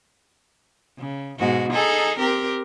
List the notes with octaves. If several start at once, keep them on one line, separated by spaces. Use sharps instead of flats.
C#3
G#2 B2 F#4
D#4 G#4 A4
C4 G4 A#4